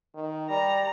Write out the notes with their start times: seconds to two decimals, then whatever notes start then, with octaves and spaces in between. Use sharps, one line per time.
0.15 D#3
0.50 G3 D5 A#5